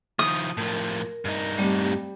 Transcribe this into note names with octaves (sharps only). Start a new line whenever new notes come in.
D#3 F3 D#6
A2 F3 A#4
G2 D#4
G3 A3 C4 G4